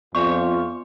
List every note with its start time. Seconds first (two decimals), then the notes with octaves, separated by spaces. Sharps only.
0.15 F2 B3 F4 D5 G#5 C#6